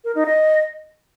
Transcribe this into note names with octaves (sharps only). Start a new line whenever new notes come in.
A#4
D#4
D#5